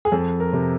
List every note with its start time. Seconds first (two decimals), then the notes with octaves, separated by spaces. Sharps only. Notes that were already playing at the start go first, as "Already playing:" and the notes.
0.05 G#4
0.12 F2 A4
0.40 A#4
0.53 C3